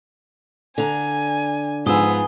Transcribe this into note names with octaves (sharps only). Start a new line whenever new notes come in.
D3 G#5 A#5
G#2 F3 B3 G#4 G#5 D#6 E6 G7